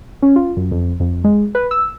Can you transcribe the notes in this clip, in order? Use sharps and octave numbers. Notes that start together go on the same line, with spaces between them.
C#4
F4
F#2
F2
F2
G#3
B4
E6